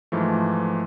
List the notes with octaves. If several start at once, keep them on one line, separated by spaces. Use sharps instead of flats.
G#2 E3 F3 A3